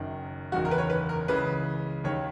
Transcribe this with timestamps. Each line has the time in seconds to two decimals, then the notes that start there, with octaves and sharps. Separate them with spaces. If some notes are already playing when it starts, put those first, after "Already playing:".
Already playing: F#1 F#2 D#3
0.52 F#1 E2 D#3 F#4
0.65 A#4
0.71 B4
0.78 C#5
0.90 B4
1.09 A#4
1.28 C#2 C#3 E3 B4
2.04 D#2 D#3 C#5